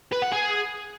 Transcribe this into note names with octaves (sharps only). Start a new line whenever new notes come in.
B4
F#5
G#4